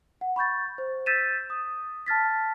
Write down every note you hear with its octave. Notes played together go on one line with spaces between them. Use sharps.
F#5
B5 C#6 G6 A6
C5
E6 G6 A6 B6 D#7 E7
D#6
A5 F6 A6 B6